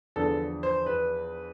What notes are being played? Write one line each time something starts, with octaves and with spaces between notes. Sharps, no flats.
E2 D3 F3 A4
C5
B4